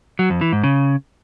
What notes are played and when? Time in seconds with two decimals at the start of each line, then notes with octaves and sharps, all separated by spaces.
0.19 F#3
0.30 F2
0.41 E3
0.52 G#2
0.64 C#3